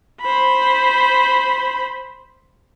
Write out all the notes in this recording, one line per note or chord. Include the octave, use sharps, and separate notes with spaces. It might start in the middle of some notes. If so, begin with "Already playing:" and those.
C5 B5